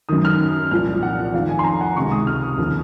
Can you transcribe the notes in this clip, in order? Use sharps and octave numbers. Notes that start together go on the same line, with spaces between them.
F#2 D#3 D#6
F6
C2 A#2 F3 F6
F#5
F2 D#3 F5
G#5
C6
A#5
F#5
C#2 C3 D#3 C#6
D#6
F6
D#6
D#2 C#3 F3